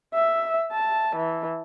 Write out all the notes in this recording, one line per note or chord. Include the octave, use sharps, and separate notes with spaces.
E5
A5
E3